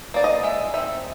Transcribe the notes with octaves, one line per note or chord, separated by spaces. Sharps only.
A#3 D#4 D5
D#5
G#3 E5
C4 D#4 E5